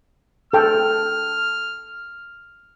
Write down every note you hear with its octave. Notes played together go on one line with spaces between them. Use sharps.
A4 G5 F6